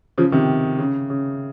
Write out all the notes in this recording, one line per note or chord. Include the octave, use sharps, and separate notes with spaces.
C#3 F3
C3 D#3
C#3
C#3